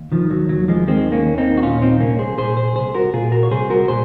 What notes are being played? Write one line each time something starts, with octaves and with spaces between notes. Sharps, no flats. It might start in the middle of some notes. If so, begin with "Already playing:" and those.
Already playing: D#2
D#3 F3
F#3
D#2 F#3
F3 G#3
D#3 G#3 C4
A#3 C#4
D#2
C4 D#4
F#4
A#2 C#4 F4
C4 D#4
C2 A#3 C#4
G#4 C5
A#2 G#4 C5
G#4 C5
C2 G#4 C5
F#4 A#4
A#2 F4 G#4
F#4 A#4
C#5
C2 G#4 C5
F#4 A#4
A#2 G#4 C5